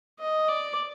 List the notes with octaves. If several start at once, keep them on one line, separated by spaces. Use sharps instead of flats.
D#5
D5